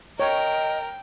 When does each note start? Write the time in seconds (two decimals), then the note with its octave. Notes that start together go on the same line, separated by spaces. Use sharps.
0.20 A#4 C#5 D#5 G5